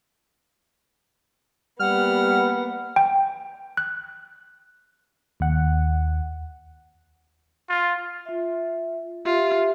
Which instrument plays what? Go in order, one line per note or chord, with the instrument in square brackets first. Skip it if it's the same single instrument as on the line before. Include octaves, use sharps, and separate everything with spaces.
[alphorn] G3 [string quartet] A#3 B3 [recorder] F#5 [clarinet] F6
[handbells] G5
F#6
[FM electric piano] D#2 F#5
[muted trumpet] F4
[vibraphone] F4 E5
[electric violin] F4 [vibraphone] G4 E5